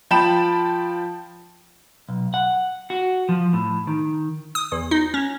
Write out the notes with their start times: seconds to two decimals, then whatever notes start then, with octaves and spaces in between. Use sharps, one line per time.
0.11 F3 G5 A5 B5 E7
2.09 B1
2.34 F#5
2.90 F#4
3.29 F3
3.53 A2
3.87 D#3
4.55 D#6
4.72 E2
4.91 D#4
5.14 C#4